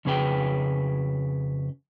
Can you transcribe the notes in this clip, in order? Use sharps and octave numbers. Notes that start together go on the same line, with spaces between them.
F2 C#3 C#4 G#4 B4 G5